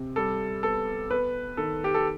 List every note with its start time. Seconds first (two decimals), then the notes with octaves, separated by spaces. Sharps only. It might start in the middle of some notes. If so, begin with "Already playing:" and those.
Already playing: C3
0.16 G3 A4
0.63 B3 A4
1.10 B3 B4
1.57 D#3 A4
1.84 G4
1.94 A4